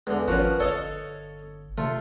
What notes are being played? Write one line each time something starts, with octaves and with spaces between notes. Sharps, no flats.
E2 D3 G#3
G#1 F3 C#4 F#4 A#4 B4
G1 A4 C#5 D#5 F5
C3 A3 F4